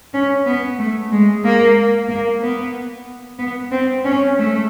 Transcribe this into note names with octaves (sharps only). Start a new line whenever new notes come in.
C#4
B3
A3
G#3
A#3
A#3
B3
B3
C4
C#4
A3